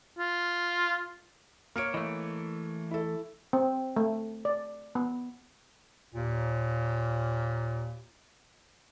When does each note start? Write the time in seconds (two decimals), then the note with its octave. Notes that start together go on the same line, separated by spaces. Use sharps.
0.19 F4
1.76 A#3 C#5 F6 C#7 D7
1.94 E3 A3 D#5
2.91 E4 A4
3.53 C4
3.96 A3
4.45 D5
4.95 B3
6.14 D#2 A#2